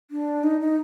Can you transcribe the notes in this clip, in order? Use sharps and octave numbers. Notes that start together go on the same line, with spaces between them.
D4
D#4
D#4